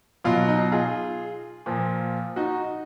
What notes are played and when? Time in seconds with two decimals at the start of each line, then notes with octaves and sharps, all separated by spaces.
0.24 B2 F#3 F4
0.48 D#4
0.72 F4 G#4
1.66 A#2 F3
2.36 D#4 F#4